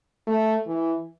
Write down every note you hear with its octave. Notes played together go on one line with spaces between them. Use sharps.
A3
E3